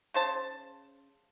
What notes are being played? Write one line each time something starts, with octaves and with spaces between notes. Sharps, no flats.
C#3 C5 A5